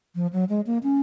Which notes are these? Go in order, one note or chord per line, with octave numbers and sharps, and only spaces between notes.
F3
F#3
G#3
A#3
C#4